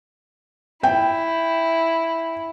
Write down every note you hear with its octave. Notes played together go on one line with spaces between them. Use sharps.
E4 G5